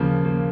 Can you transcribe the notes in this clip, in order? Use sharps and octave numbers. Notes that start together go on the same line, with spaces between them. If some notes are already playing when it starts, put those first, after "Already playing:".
Already playing: D#2 C#3 F3 A#3
A#3